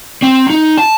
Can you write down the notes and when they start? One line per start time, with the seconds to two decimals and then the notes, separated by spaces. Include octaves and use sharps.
0.22 C4
0.50 D#4
0.78 A5